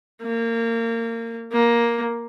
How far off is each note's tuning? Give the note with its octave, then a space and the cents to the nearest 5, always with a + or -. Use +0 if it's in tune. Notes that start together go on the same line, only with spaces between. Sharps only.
A#3 -25
A#3 +10